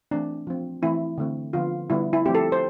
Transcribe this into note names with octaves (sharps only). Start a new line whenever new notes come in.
E3 A3 C4 D4
F3 C4
E3 A3 C4 E4
D3 A3 C4
D3 F3 B3 F4
D3 G3 B3 E4
E4
F3 A3 C4 G4
A4
C5